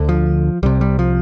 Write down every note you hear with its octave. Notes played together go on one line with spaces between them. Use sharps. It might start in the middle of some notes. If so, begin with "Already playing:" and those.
Already playing: D2 D3
F3
C2 C3 G3
G3
F3